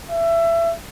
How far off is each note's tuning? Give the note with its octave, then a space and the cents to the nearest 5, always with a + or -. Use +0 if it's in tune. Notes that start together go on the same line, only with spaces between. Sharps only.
E5 +25